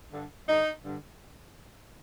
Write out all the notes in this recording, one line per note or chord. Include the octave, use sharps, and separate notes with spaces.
G2 D3
G2 D3 D#4
G2 D3